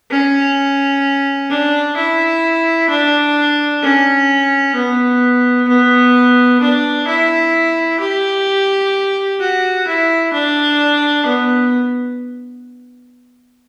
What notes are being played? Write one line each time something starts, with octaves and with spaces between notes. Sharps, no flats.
C#4
D4
E4
D4
C#4
B3
B3
D4
E4
G4
F#4
E4
D4
B3